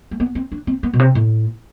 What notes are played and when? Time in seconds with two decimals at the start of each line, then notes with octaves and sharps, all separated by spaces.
0.11 A3
0.20 B3
0.35 C4
0.52 D4
0.67 C4
0.83 B3
0.94 B2
0.99 C3
1.15 A2